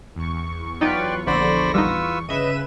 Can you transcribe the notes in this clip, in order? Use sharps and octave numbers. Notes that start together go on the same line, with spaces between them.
E2 C#6
F#3 D#4 F4 B4 D5 G5
A#1 D3 C5 D5 B5 A#6
G3 D#4 F4 B4 E6
G1 C#3 B4 D#5 E5 D#7 E7